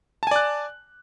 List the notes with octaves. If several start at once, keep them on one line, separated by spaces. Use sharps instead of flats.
D5 G#5 A5 F#6